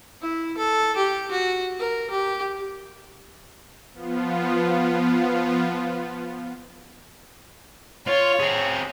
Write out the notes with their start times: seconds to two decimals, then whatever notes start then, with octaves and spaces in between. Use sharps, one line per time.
0.22 E4
0.57 A4
0.96 G4
1.31 F#4
1.79 A#4
2.10 G4
3.93 F3 B3 F4
8.07 F4 C#5
8.40 C4 G#4